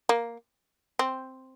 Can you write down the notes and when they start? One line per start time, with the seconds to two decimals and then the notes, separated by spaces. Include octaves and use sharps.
0.09 A#3
0.99 C4